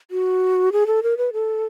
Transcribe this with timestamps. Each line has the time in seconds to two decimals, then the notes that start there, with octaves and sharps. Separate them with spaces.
0.11 F#4
0.72 G#4
0.87 A4
1.03 A#4
1.17 B4
1.33 A4